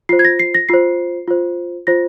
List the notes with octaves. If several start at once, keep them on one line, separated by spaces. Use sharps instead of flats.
F4 C5 C7
G#6
A#6
C7
A#6
F4 C5 C7
F4 C5
F4 C5 A#6